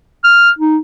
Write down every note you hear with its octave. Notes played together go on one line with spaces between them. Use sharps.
F6
D#4